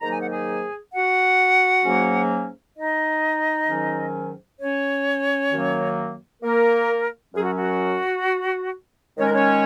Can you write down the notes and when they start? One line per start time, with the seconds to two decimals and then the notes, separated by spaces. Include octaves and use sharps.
0.01 G#2 D#3 F#3 A#3 D#4 A#5
0.10 G#5
0.21 F#5
0.30 G#4 G#5
0.92 F#4 F#5
1.84 G#2 F#3 A#3 C#4
2.76 D#4 D#5
3.68 G#2 D#3 F#3 C#4
4.59 C#4 C#5
5.51 F#2 D#3 F#3 A#3
6.43 A#3 A#4
7.34 F#2 F#3 C#4 G#4
7.42 F#4
7.56 F#4
9.17 D#3 G#3 C#4 C#5
9.25 A#4
9.32 C#4 C#5